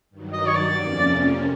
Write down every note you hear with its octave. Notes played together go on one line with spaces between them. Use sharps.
G2 D#3 F#3
D#5
C#5
D5
F2 C3 F3 A#3 C#4